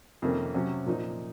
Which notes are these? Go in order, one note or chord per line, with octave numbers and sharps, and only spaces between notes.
F2 C3 D#3 A#3 C#4
C3 F#3 C#4
A#2 F3 A#3 D#4